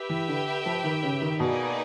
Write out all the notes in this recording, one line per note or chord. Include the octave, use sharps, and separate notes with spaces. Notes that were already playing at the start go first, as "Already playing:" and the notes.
Already playing: G4 B4 E5 G5
E3
D3
F3
D#3
C#3
D#3
B2 A#3 D#4 G#4 B4 D5